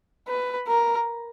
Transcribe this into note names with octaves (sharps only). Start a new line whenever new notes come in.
B4
A#4